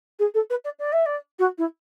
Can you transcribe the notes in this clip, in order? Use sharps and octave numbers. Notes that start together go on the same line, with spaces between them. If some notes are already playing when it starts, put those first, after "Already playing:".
G#4
A4
B4
D5
D5
E5
D5
F#4
E4